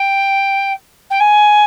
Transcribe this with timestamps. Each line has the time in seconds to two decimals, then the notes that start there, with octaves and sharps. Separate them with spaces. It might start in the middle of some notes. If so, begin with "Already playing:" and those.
Already playing: G5
1.10 G5
1.20 G#5